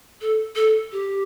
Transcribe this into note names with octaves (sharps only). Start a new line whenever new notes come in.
A4
A4
G4